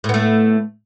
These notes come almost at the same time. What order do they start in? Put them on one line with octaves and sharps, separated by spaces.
A2 B3 A3